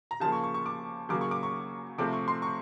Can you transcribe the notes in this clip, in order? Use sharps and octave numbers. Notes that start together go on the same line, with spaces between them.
A#5
C#3 F3 A#3 A5
C#6
C#6
C#6
D6
C#3 F#3 A#3 D6
C#6
D6
C#6
C3 F3 A3 C4 D6
C#6
C6
C#6